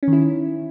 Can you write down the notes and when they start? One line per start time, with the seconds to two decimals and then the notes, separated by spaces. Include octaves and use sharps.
0.03 C#4
0.08 D#3
0.13 E4